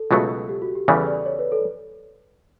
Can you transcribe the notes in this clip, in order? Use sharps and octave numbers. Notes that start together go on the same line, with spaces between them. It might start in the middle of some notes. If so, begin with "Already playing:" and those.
Already playing: A4
C#2 B2 F#3 A3
G4
F#4
G4
E2 C#3 E3 G3 A4
D5
C#5
B4
A4